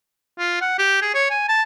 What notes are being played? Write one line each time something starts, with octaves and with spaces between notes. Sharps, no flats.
F4
F#5
G4
G#4
C#5
G#5
A5